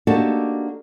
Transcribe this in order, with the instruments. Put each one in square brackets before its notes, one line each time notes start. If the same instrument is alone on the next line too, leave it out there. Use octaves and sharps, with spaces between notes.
[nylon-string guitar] A#3 D4 D#4 F#4 G4 A4